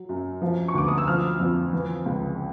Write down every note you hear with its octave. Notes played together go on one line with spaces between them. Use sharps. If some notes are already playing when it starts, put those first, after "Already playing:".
Already playing: F#3
F#2
F3
C#6
D2 D6
D#6
E6
F3 F6
F2
E3
C#2